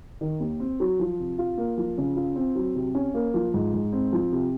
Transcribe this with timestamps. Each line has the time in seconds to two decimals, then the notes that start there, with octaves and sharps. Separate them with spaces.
0.21 D#3
0.40 D#2
0.60 C4
0.80 F#3
0.99 F3
1.19 C3
1.38 F4
1.57 A#3
1.77 F3
1.98 C#3
2.16 F4
2.36 C4
2.55 F#3
2.75 C3
2.95 C#4
3.14 A#3
3.34 F3
3.54 G#2
3.73 G#2
3.93 C4
4.13 F3
4.32 C3